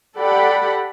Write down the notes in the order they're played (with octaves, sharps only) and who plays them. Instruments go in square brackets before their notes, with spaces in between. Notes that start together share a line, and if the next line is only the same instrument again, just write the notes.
[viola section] G4 A4 D5 F#5 G5 B5